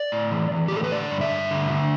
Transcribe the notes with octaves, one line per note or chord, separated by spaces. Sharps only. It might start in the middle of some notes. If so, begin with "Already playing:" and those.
Already playing: D5
A2
E3
E3
G4
A2 A4
B4
D3 D5
G2
E5
G2
D3
D3